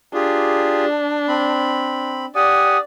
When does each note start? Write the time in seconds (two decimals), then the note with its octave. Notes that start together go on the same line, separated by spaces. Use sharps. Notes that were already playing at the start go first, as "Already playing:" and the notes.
0.14 D4 F4 G4 G#4
1.28 C4 B5
2.36 G4 D5 F#5 G#5 D#6